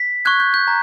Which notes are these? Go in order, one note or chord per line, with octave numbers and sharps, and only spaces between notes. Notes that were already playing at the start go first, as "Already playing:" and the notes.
Already playing: B6
C#6 F#6 G#6
G6
G6
A#5